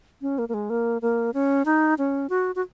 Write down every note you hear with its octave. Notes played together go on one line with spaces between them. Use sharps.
C#4
A#3
A#3
G#3
A#3
A#3
C#4
D#4
C#4
F#4
F#4